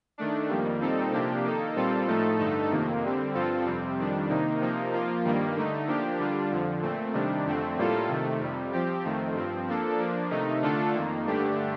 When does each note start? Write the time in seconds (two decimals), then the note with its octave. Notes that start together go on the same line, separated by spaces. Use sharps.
0.18 D#3 A3 D4
0.49 F2 D#3 G3 A#3
0.81 A#2 G3 C4 D#4 A4
1.12 C3 F3 A#3 D4 G4
1.44 D#3 A#3 D#4 A4
1.76 A#2 G3 C4 F4 A4
2.07 A2 F3 A3 D#4 A4
2.39 G2 D3 A3 D#4 A4
2.70 F2 C3 D#3 A#3
3.03 D3 G3 C4
3.34 G2 F3 C4 F4 A4
3.66 F2 C3 G3 C4
3.98 F2 D#3 G3 D4
4.29 C3 D#3 A#3 D#4
4.61 C3 F3 A#3 D#4
4.93 F3 A#3 F4
5.25 G2 D#3 G3 A#3
5.56 D3 A3 D#4
5.87 F3 A#3 D4 G4
6.19 D3 G3 D4 F4
6.51 F2 D3 F3
6.82 A#2 A3 C4
7.13 C3 D#3 G3 D4
7.45 F2 D3 A3 C4
7.77 A2 G3 A#3 F4 A4
8.08 C3 D#3 A3
8.40 F2 C3 G3
8.72 F3 C4 G4
9.04 F2 D#3 A3 C4
9.35 G2 F3 C4
9.67 F3 A#3 D4 A4
9.99 F3 A#3 D4
10.30 C3 D#3 A3 D#4
10.62 D3 A3 D4 F4 A4
10.94 F2 D#3 A#3
11.25 G2 D3 A3 D4 G4